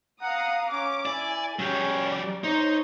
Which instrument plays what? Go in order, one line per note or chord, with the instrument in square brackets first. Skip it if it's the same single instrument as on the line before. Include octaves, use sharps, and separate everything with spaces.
[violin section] F5 A#5 D#6 [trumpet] F#5
[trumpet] C#4 [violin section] D6
[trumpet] E4 [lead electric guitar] D5 [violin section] G#5
[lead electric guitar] F#3 G4 [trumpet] C#4 [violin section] G#4
[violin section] D5
[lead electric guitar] D#4 [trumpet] C5 [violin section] C#5 A#5